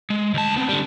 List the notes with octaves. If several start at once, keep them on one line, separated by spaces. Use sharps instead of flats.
G#3
D2 A5
B3 C4
D3 G3